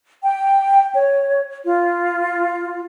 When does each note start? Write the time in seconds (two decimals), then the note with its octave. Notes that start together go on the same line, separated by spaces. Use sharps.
0.22 G5
0.93 C#5
1.64 F4